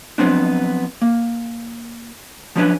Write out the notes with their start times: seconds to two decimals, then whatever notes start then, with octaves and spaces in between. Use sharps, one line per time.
0.18 F3 F#3 B3 C4 D4
1.02 A#3
2.56 F3 F#3 C#4 D4 B4